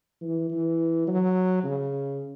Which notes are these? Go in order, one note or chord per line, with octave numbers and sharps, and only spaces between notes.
E3
E3
F#3
C#3